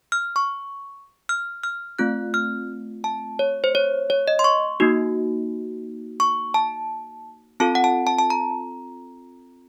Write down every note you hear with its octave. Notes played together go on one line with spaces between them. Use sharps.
F6
C#6
F6
F6
A3 C4 F4 F#6
F6
A5
C#5
C5
C#5
C#5
D#5
C6
C#6
A#3 D#4 F#4
C#6
A5
C4 F4 A4 A5
F#5
A5
A5
A5
A#5